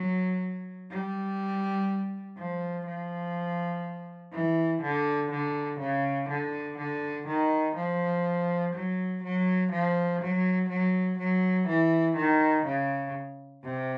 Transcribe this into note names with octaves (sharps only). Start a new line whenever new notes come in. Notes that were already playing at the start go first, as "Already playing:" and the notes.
Already playing: F#3
G3
F3
F3
E3
D3
D3
C#3
D3
D3
D#3
F3
F#3
F#3
F3
F#3
F#3
F#3
E3
D#3
C#3
C3